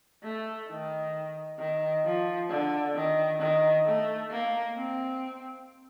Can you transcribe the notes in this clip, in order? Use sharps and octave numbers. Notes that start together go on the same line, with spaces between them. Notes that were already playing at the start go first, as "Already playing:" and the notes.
A3
D#3
D#3
F3
D3
D#3
D#3
A3
A#3
C4